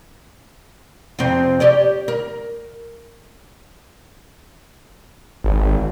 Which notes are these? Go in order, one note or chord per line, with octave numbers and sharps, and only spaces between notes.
F2 C3 C4
G4 C#5 D5
A#4
G#1